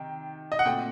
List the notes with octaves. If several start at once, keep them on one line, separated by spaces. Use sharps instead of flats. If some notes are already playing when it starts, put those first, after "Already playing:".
Already playing: C3 D#3 G5
D#5
F#5
A#2 A3 C4 G5